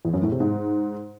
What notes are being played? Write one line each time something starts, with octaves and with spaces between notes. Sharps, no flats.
E2
F#2
A2
C3
G#2